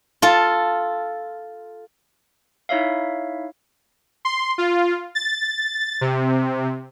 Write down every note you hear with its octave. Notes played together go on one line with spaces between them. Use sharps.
F4 A4
D#4 E4 C#5 E5 F5
C6
F4
A6
C3